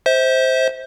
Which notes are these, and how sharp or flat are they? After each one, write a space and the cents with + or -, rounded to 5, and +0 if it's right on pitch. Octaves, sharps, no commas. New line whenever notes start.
C5 +0 E5 -35